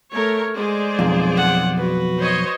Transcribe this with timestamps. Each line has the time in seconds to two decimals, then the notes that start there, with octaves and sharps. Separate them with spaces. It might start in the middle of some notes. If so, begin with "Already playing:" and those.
0.13 A3 A#4 C#5
0.57 G#3 G#4 C5 D5
0.99 B1 F2
1.38 F#5
1.77 F#4 B4
2.19 C5 C#5 D#5